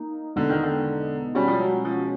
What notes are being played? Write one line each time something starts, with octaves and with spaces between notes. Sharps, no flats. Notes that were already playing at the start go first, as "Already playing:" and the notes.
Already playing: A#3 D#4
E2 B2 D3 G#3 B3 D#4
D#3
D3
B2 G3 G#3 C#4 F#4
F3
F#3
F3